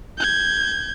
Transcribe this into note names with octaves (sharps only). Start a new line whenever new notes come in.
G6 G#6